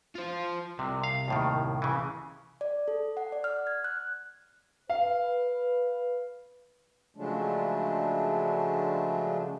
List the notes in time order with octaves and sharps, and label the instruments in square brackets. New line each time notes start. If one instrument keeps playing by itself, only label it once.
[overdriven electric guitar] F4 C5
[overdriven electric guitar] C2 [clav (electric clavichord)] C3
[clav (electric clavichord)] F5
D#2 A2 D#3
C#3 E3
[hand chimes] D5
A4
F#5
D5
F6
G#6
F#6
[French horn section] B4 [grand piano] F5
[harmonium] C#3 F3 F#3 G#3 A3 D4